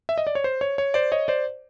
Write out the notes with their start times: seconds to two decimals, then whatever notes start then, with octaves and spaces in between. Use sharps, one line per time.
0.09 E5
0.18 D#5
0.27 D5
0.35 C#5
0.44 C5
0.61 C#5
0.78 C#5
0.94 C5 D5
1.12 C#5 D#5
1.28 C5 D5